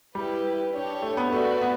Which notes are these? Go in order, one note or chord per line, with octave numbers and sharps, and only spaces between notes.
G3 E4 G4 B4
D4 G4 C#5
A3
B3
A3 F#4 B4 D5
B3